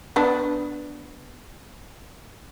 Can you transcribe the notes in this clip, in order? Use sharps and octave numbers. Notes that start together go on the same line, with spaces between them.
B3 D4 B4